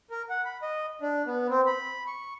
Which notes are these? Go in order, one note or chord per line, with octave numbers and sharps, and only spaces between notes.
A#4
F#5
B5
D#5
D4
B3
C4
B5
C#6